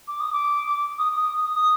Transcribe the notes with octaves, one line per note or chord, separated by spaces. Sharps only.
D6
D#6
D6
D#6
D#6
D#6
D#6